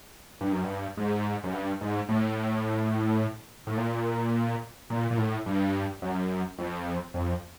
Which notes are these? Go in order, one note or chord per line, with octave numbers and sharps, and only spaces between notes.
G2
F#2
G2
G#2
F#2
G2
G#2
A2
A2
A#2
A#2
A#2
A2
G2
F#2
F2
F2